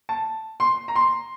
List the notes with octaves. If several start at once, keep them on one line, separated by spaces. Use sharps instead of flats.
A5
C6
A#5
C6